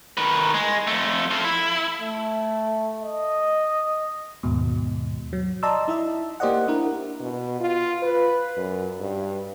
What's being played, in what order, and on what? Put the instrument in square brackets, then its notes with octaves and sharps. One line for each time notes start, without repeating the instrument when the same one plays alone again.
[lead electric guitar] D#3 B4
G#3
F2 A3
F4 A4
E4
[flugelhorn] A3
D#5
[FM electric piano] D#2 G#2 B2
F#3
D5 D#5 A5 A#5 C6 E6
D#4 E4 D#5 E5
A#3 G4 C5 D5 D#5 F#5
D4 E4 A#4
[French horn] B2
F4
B4
F#2
G2